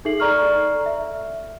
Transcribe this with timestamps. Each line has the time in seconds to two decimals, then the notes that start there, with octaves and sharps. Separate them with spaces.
0.05 D#4 G#4 A4 E5 C7 F#7
0.20 A4 D5 A#5 C#6 F6
0.86 E5